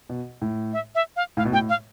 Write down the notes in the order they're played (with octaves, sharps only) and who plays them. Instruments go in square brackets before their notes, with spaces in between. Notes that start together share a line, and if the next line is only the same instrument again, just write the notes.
[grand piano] B2
A2
[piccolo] E5
E5
F5
[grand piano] A2 [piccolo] F5
[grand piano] B2
[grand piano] A2 [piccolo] G5
[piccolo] F5